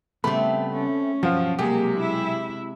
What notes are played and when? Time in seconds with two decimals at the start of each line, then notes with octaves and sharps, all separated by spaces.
0.24 C#3 G3 A3 B3 C4 B5
0.73 C#4
1.23 B1 G2 F3 F#3 F4 F#4
1.59 C3 G#3 A#3 G4 G#4
1.96 E4 E5